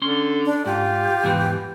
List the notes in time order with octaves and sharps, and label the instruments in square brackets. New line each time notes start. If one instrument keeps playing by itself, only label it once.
[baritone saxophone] D3 [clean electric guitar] C#4 C6
[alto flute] D4
[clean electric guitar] G#2 [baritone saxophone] F4 [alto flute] G4
[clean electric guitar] E2 G#2 E3